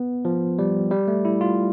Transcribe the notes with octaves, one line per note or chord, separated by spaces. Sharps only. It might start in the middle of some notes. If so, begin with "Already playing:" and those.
Already playing: B3
F3
G3
G3
A3
E4
F4